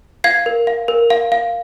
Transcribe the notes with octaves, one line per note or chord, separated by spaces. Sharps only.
F5 G#6 C7
A#4
F5
A#4
F5
F5